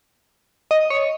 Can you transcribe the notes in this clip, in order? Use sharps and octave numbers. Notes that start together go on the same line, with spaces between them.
D#5
C#5